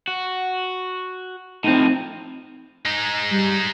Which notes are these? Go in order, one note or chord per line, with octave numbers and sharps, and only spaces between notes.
F#4
A2 F3 C4 D#4
G#3 D#4
G3